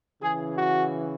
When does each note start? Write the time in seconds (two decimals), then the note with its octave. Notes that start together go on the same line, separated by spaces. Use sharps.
0.22 C#3 E3 G#4
0.55 F#4